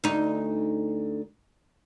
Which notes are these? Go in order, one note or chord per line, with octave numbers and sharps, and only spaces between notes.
D2 D#4